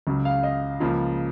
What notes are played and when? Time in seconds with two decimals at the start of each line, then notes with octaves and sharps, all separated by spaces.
0.07 C#2 C#3 F#3
0.25 F5
0.43 D#5
0.80 C#2 C#3 F3 A#3